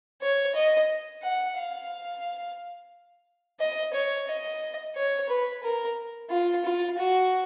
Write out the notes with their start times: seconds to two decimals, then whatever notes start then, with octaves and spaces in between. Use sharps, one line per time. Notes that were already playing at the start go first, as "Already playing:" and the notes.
0.22 C#5
0.55 D#5
1.23 F#5
1.57 F5
3.60 D#5
3.93 C#5
4.28 D#5
4.96 C#5
5.29 B4
5.63 A#4
6.30 F4
6.65 F4
6.98 F#4